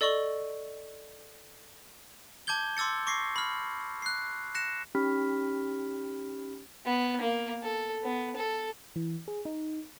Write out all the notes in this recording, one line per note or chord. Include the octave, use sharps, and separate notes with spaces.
A4 D5 D#5 C#6 F#7 G7
A5 D6 G6 G#6 G7
C6 D6 E6 A6 C#7
C#6 D6 A#6 C7
B5 F6
F#6 C7
F#6 A#6 C#7 E7
C#4 D#4 G4 B5 F6 B6
B3
A#3
A4
B3
A4
E3
G#4
D#4